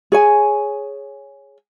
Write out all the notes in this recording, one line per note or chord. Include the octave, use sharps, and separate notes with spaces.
G#4 C#5 G#5